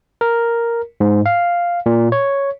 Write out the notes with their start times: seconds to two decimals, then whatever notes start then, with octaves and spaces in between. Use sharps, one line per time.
0.21 A#4
1.00 G#2
1.26 F5
1.86 A#2
2.12 C#5